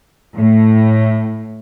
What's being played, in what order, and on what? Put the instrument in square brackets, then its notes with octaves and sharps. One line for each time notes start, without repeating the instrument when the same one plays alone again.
[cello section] A2